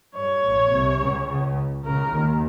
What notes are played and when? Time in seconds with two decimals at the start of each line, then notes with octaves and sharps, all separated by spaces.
0.15 G2 C#5
0.44 A#1 A#2
0.71 C2 C3
1.00 C#2 C#3
1.28 C#2 C#3
1.85 C#2 C#3 A#4
2.13 D#2 D#3